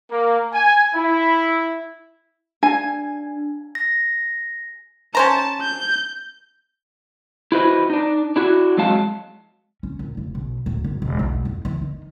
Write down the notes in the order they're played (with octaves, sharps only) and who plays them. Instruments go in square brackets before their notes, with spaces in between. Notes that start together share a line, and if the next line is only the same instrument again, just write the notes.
[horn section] A#3
G#5
E4
[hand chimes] D4 [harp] G#5
[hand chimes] A#6
[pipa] C#4 C5 A#5 [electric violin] A5
[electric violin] G6
[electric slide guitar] E4 F#4 B4 C5 D#5
D4 D#4
D4 E4 F#4
F2 F#3 G#3 F5 A5
[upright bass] C#4
A#1
F1
B1
D1
F#1
E1
B1
F2
E3
D#3